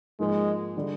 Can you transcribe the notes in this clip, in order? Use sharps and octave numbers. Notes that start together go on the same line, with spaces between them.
G#2 F3 G#3 A#3
D3 G3